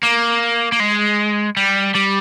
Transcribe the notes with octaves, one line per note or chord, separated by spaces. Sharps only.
A#3
A#3
G#3
G3
G3